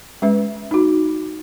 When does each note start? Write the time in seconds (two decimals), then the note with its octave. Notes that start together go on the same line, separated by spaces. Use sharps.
0.22 G#3 C#4 B4 E5
0.71 D#4 F#4